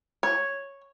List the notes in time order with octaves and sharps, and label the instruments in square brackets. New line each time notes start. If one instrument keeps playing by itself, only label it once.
[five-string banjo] C#5